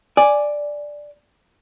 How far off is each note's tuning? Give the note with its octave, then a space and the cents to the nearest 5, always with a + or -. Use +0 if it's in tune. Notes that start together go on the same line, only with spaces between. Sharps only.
D5 +0 G#5 +0